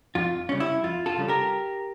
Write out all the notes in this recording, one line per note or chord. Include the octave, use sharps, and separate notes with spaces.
F2 F4
C#3 G3 C#4
E4
F2 F4
F4 A4
C#3 G3 C#4
G4 A#4